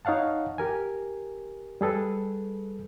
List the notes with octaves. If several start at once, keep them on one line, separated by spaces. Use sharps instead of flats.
D#4 C#5 F5 F#5 A5
G4 A#4 G#5
G3 G#4 A4 B4